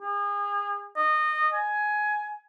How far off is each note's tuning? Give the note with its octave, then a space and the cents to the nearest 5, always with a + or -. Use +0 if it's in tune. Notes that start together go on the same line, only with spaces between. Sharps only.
G#4 -35
D#5 -25
G#5 +15